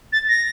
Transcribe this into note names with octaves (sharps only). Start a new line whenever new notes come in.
A6
A#6